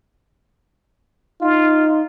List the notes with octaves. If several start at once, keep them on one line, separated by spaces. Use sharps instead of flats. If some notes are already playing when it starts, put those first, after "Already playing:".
D#4 F4